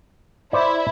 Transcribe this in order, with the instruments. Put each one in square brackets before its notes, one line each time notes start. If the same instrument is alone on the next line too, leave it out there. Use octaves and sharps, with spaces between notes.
[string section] E4 [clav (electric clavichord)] C5 D5